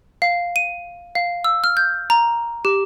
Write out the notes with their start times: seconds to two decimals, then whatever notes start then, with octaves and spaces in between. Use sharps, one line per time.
0.22 F5
0.56 D#7
1.15 F5
1.44 E6
1.64 F6
1.77 G6
2.10 A#5
2.65 G4